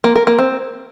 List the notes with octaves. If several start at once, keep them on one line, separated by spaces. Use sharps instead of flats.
A#3
A#4
A#3
C4